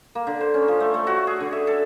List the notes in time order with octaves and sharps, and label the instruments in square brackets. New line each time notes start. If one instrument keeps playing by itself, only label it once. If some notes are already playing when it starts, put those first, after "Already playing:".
[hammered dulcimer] A#3
D3
C5
C#4
F3
A3
A3
F#4
G#4
D3
E5
A4